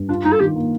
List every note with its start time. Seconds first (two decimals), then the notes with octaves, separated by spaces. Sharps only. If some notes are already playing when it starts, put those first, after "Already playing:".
Already playing: G2
0.09 D4 F4
0.25 G2 D#4
0.32 A4
0.40 D#3 G4
0.56 A#3